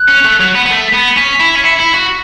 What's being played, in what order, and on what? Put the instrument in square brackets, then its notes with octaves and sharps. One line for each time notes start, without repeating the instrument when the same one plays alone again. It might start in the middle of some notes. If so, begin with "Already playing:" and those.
Already playing: [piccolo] F#6
[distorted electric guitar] C#4
A3
F#3
B3
B3
[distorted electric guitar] A3 [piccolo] B6
[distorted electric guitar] B3
[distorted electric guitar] C#4 [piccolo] B6
[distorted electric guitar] E4
[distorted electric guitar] C#4 [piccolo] B6
[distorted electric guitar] E4 [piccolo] C#7
[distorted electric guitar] E4
F#4